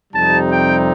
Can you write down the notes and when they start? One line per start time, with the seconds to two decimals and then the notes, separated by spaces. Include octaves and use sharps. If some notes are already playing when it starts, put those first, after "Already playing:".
0.13 F2 C3 G3 C4 D#4 A5
0.50 G5